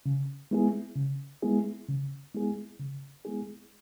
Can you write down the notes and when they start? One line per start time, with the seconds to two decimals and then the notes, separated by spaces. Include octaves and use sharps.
0.06 C#3
0.51 G#3 B3 E4 G#4
0.96 C#3
1.42 G#3 B3 E4 G#4
1.88 C#3
2.34 G#3 B3 E4 G#4
2.79 C#3
3.25 G#3 B3 E4 G#4